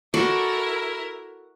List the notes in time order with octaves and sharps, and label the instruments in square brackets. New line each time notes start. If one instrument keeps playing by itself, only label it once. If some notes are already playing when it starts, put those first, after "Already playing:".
[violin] E4 A#4 [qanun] F#4 A4 D5